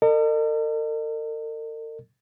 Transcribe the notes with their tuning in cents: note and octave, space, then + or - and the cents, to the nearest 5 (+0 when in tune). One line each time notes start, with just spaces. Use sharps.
A#4 -45 D#5 -40